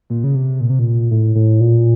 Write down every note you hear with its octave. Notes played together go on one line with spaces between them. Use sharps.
A#2
C#3
C3
A#2
C3
A#2
A2
A2
A#2